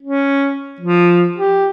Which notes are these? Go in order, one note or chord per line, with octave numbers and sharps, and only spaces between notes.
C#4
F3
G4